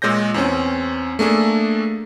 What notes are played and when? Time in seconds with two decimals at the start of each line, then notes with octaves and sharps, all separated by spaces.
0.02 A#2 G#3 C#5 G6 A#6
0.34 E2 C4 C#4
1.19 A3 A#3 D4 G#4 A4